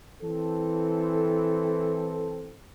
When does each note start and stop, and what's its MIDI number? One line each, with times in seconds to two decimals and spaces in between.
0.22 2.55 52
0.22 2.55 60
0.22 2.55 69